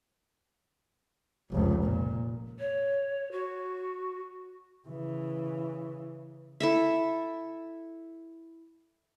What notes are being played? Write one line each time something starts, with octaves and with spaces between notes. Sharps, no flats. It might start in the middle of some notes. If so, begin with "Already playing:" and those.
F1 C#2
A#2
C#5
F#4
C#3 E3
E4 A4 E5